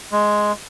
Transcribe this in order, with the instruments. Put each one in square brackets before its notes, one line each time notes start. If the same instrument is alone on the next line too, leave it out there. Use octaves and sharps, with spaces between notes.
[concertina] G#3